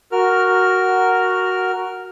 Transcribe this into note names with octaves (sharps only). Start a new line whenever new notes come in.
F#4 A#4 F6